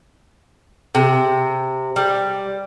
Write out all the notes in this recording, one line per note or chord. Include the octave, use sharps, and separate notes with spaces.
C3
G3